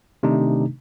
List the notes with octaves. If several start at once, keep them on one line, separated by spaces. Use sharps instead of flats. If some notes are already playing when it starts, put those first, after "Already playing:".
C3 D#3 A3 D4 D#4